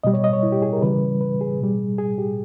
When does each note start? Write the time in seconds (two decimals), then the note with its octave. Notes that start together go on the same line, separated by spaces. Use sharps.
0.04 B2 G3 D#5
0.14 C#5
0.24 D#5
0.33 C#5
0.43 E4
0.52 G4
0.62 G#4
0.73 A#4
0.82 C#3 E3 G3 B4
1.21 B4
1.41 G#4
1.60 B2 G3
1.98 G#4
2.18 G4